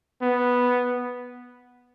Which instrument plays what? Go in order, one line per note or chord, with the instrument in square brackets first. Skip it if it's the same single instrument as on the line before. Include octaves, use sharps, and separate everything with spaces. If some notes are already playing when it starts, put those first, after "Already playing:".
[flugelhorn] B3